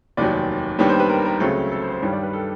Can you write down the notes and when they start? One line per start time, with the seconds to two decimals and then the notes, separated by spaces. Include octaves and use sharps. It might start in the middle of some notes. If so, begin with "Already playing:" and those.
0.17 F1 D#2 D#3 F#3 D5
0.78 D#2 D#3 G3 B3 D4 C#5
0.89 C5
1.00 B4
1.09 A#4
1.25 A#4
1.40 C#2 C#3 F#3 A3 C4 A4
1.72 A4
1.82 C5
1.92 C5
2.02 G2 D#3 G3 C#5
2.13 D5
2.23 B4
2.33 A4